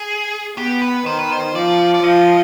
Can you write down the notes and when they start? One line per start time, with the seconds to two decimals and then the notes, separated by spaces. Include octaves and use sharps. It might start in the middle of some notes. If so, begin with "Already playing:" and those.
Already playing: G#4
0.57 B3 G4
0.82 B4
1.06 D#3 C5
1.19 B4
1.32 C5
1.55 F3 D5
1.94 D5
2.03 F3 D#5